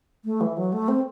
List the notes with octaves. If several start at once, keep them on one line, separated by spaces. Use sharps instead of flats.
A3
E3
F#3
A3
C4